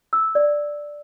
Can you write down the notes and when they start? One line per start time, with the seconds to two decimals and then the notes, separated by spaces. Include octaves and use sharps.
0.13 E6
0.35 D5